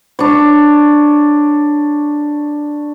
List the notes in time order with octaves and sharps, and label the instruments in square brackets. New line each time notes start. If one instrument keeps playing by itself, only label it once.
[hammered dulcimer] D4 C#5